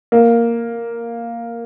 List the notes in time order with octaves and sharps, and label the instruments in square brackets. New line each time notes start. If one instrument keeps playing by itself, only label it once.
[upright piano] A#3